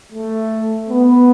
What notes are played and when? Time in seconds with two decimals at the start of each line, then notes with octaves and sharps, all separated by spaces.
0.12 A3
0.89 B3